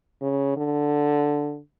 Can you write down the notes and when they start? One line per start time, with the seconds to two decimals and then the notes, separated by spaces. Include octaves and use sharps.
0.22 C#3
0.57 D3